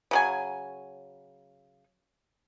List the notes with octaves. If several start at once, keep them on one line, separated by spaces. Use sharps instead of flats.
C#3 F#3 G#5